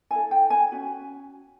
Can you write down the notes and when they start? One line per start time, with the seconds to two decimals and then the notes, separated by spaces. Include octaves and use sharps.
0.11 E4 A4 G#5
0.31 G5
0.50 G#5
0.72 C#4 F#4